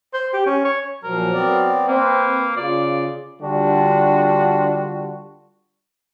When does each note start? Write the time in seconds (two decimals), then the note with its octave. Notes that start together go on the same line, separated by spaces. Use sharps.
0.14 C5
0.34 G4
0.46 C#4
0.65 C#5
1.04 A#2 F3 F#3 A#4
1.33 B3 C4 D5
1.88 A#3 C4 B4
2.57 C#3 F4 D5
3.41 D3 G3 D4 F4 F#4